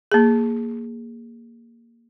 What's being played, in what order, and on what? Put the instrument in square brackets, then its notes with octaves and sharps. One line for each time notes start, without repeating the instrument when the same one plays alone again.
[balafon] A#3 G#4